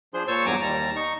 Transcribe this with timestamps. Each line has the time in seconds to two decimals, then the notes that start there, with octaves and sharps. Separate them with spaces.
0.14 F3 D4 G#4 C5 C6
0.28 A#2 C5 C#5 A5 C#6 E6
0.46 E2 G2 F#3 G#5 A#5 D6
0.61 D#2 G3 A5 A#5
0.96 D#4 C#6